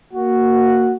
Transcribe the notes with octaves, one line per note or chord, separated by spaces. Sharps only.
A#3 F#4